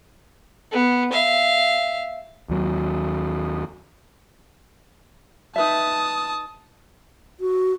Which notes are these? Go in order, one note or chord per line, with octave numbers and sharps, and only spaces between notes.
B3
E5 F5
D#2 F#3
D#4 B4 E5 A5 D#6
F#4